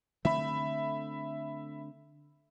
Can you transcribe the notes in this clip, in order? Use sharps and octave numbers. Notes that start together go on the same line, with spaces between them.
D3 A3 C4 E5 B5